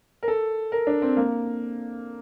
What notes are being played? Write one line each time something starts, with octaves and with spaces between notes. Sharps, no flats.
A#4
A4
A#4
D4
C4
A#3